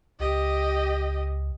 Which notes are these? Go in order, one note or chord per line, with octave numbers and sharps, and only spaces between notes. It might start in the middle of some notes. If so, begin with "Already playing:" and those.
C#2 G4 D#5